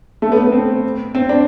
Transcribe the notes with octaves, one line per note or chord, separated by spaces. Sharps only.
A3
B3
B3
C4
C4
D4